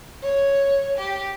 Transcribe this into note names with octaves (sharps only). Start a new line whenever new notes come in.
C#5
G4